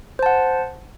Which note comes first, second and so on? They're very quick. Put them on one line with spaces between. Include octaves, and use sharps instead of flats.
C5 A5 F#5